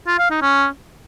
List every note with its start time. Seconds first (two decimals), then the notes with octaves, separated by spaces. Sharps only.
0.07 F4
0.19 F5
0.30 D#4
0.42 C#4